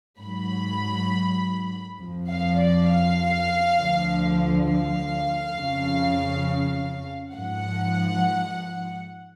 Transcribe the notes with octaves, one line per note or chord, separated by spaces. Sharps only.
G#2 F#3 B5
F2 F3
F5
D5
F5
D2 D3 F3
F5
F2 C#3 F3
G#2 F3 F#5